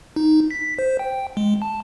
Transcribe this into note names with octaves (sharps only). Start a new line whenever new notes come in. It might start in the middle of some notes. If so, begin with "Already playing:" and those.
D#4
B6
C5
G5
G#3
A5